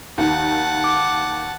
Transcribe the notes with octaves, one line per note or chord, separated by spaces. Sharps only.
D#2 D#3 F#5 A5
D6